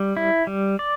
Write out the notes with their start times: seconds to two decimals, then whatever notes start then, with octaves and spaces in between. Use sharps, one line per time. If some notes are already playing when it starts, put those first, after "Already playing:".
Already playing: G3
0.17 E4
0.47 G3
0.79 D5